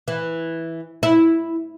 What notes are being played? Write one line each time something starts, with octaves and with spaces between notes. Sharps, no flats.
E3
E4